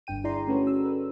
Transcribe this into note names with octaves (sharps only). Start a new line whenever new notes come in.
G1 G2 D3 G5 D#7
E4 G#4 D5 A#5 C6
A3 C#4 F#4 A4 B4 C#5
E6
B4